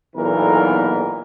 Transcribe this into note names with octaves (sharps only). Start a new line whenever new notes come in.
B1 E2 A#2 E3 A#4